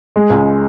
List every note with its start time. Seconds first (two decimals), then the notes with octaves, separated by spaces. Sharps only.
0.16 G#3
0.30 C#2